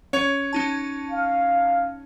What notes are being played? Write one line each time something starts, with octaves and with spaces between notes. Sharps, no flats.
C#4 C#5
C#4 D#4 A5
F5